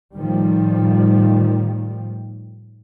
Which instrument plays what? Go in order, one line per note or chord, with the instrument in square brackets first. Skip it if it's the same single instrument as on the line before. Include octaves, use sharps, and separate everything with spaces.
[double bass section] A2 D#3 F3 G3